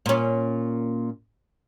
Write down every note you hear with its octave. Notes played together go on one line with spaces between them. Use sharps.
A#2 C#4